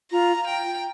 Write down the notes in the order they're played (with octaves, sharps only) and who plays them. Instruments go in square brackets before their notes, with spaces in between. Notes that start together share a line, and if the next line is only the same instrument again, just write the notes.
[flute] F4 [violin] A#5
[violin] G5